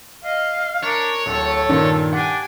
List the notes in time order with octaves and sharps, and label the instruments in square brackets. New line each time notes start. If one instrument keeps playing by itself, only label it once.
[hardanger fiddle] D#5 [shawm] F5
[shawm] D4 [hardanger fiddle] A#4 [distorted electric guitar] C#5
[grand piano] D1 [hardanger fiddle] A3 [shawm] A4
[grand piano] G2 A#2 D#3
[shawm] D4 [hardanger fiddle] G4 G#5 [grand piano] F#5